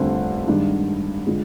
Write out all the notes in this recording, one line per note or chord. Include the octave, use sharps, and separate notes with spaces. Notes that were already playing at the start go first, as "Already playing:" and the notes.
Already playing: F1 D#2 D3 G3 C4
G2 D#3 G#3 D4
D3 F3 G#3